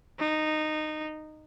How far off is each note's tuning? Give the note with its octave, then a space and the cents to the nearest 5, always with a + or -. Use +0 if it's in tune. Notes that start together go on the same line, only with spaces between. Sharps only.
D#4 -15